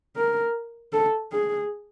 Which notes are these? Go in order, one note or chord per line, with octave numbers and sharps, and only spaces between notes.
A#4
A4
G#4